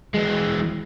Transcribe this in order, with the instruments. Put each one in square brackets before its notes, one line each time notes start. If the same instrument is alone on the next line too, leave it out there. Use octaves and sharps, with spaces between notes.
[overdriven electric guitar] E3 G#3